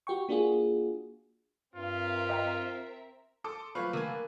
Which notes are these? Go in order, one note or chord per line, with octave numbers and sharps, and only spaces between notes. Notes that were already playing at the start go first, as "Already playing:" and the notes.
F#4 G4 G5 C#6
A#3 D4 F4 F#4 G#4
G2 C4 F4 A#4 E5
D#5 G5 A#5
A4 C6 D6 D#6
F3 F#3 A3 B4 F5 C#6
D3 A#3 G#5